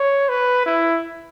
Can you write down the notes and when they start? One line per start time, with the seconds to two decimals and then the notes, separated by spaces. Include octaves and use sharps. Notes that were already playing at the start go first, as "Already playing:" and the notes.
Already playing: C#5
0.29 B4
0.66 E4